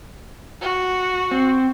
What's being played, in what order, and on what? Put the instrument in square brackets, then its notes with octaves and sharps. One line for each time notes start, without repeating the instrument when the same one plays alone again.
[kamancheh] F#4
[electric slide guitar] C4